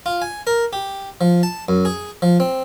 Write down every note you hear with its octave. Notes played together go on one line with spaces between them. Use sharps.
F4
G#5
A#4
G4
F3
A5
F#2
G#4
F3
C4